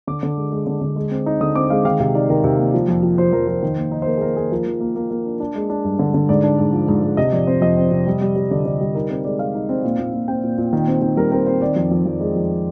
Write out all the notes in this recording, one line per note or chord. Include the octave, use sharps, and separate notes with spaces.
D3 D6
D3
G#3
G#3
D3
D3
G#3
C4
D#4
D3 D#6
C4 D6
G#3 F5
D#3 F5
C3 F5
D#4 D5
D#3 A#4
C3
A#3
F3
F2
F3
F3 C5
F2 A#4
F3 C5
D#3
A#3
D#4
C5
A#3 A#4
G#4
A#3 A#4
A#3 G#4
F3 A#4
F3
A#3
A#3
A#3
D4
D4
G#3
D4
G2
D3
D3
G#2 D5
D4
G#2
F3
G#2
G#2
C3 D#5
F2 D5
C4 C5
F2 D#5
C4
C3
G3
G3
G3
D3 D5
D3 D5
G3
D#4 A#4
C4 A#4
G#3 D5
G#3 F5
D#4
C4
A#2
A#2
A#2
C4 G5
A#2
A#2
D#3
C4
D#3
G3 A#4
C4 A#4
C4 C5
D#3 D5
F2
F2
F2
G#3
F2